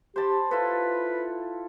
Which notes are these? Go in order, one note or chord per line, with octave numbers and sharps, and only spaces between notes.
G4 C5 A5 B5
E4 F4 A4 B4